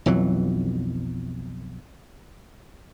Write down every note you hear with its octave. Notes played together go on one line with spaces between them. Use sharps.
B1 F2 E3 F#3